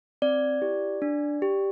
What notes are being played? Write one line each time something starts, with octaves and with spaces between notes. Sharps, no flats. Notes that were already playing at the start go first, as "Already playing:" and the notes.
C4 D5
E4 G4
D4
G4